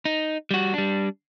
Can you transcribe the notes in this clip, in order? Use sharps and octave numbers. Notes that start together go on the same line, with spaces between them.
D#4
G3 F#4
G3 D4